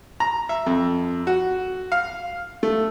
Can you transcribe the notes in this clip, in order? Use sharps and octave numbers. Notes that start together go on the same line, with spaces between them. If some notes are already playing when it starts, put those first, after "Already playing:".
A#5
E5
F2
F#4
F5
A3